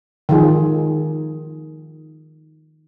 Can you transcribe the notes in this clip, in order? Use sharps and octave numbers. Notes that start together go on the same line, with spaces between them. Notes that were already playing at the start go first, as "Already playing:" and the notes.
D#3 F3 F4 G#4